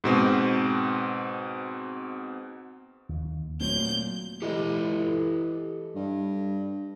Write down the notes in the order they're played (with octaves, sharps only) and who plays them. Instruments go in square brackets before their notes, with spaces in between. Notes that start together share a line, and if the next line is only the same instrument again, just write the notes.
[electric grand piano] G#2 B2 C4
[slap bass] D#2
[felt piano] A#2 F#3 [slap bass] A3 C4 [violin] G6
[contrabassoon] E3 [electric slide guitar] G4 A4 D#5
[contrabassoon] G2